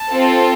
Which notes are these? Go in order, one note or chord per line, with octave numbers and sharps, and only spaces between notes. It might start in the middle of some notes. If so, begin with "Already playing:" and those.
Already playing: A5
C4 F4 A4